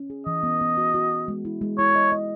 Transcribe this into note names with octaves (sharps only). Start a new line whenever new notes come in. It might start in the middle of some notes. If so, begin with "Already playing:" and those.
Already playing: C#4
G#4
E3 D#5
B3
B3
F#4
F#4
F#4
G#3
E4
G#3
E4 C#5
D#5
D#5